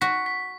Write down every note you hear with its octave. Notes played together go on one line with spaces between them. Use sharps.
F#4 B6
B6